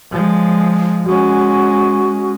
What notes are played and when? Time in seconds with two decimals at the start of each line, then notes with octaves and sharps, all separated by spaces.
0.11 F3 G#3
1.06 G#3 C#4 F#4